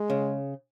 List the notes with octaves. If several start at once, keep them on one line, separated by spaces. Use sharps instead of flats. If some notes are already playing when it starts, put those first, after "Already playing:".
Already playing: G#3
C#3